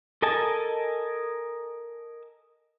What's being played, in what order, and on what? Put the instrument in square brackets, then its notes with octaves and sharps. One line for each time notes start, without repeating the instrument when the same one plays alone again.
[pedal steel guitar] A4 A#4 D#5 G#5 A5